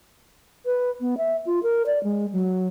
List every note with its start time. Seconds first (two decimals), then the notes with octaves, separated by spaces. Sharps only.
0.65 B4
1.01 B3
1.18 E5
1.46 F4
1.63 A#4
1.86 D5
2.03 G#3
2.32 F#3